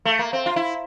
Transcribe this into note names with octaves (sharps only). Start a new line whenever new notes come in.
A3
A#3
C4
F4
E4